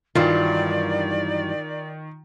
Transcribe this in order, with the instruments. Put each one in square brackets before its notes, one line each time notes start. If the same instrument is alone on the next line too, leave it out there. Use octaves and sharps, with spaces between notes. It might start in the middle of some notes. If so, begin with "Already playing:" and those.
[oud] G2 E3 F#3 [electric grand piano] D#3 [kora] F4 [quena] D5